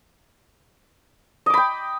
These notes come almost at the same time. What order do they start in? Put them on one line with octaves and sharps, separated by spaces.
D#5 D6 B5 G5